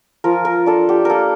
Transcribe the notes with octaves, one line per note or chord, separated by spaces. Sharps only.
F3 A#4
A#4
D4 A4
G4
A#3 A4 A#4